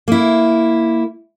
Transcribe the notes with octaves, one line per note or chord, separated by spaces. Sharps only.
A#3 E4